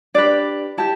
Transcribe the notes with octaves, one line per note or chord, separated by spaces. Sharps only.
D4 G4 B4 D5
E4 G4 A5